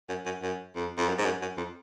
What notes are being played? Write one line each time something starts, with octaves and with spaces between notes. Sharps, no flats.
F#2
F#2
F#2
F2
F2
F#2
G#2
F#2
F#2
F2